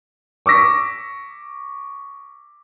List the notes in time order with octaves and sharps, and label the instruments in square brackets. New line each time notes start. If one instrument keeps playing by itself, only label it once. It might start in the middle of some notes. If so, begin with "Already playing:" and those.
[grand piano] C#6 D6 E6 A#6 B6